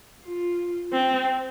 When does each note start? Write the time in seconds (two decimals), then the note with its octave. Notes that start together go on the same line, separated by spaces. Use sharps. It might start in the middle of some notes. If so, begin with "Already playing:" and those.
0.23 F4
0.93 C4